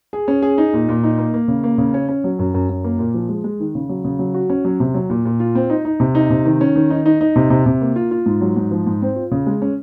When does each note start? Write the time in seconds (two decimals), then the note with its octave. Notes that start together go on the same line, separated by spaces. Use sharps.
0.13 G#4
0.28 C#4
0.42 G#4
0.58 D#4
0.73 A#2
0.89 A#2
1.04 D#4
1.18 A#3
1.34 A#3
1.48 C#3
1.64 A#3
1.78 C#3
1.94 C#4
2.08 C#4
2.24 F#3
2.39 F#2
2.54 F#2
2.69 F#2
2.84 A#3
2.99 A#2
3.14 F3
3.29 G#3
3.44 G#3
3.60 D#3
3.75 C#3
3.89 F#3
4.04 C#3
4.19 F#3
4.34 F#4
4.49 C#4
4.65 F#3
4.80 C3
4.94 F#3
5.10 A#2
5.25 A#2
5.40 F4
5.55 C4
5.70 D#4
5.85 D#4
6.00 C3
6.15 D#4
6.30 C3
6.45 D#3
6.61 C#4
6.76 D#3
6.90 D#4
7.06 D#4
7.21 D#4
7.36 C3
7.50 C3
7.66 C3
7.81 A#3
7.96 F4
8.11 F4
8.26 G#2
8.41 F#3
8.56 G#2
8.71 F3
8.86 G#2
9.02 C4
9.16 F4
9.31 C#3
9.46 G#3
9.62 C#4